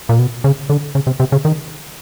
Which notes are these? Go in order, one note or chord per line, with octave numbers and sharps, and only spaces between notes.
A#2
B2
C#3
D3
C#3
C3
C3
C#3
D#3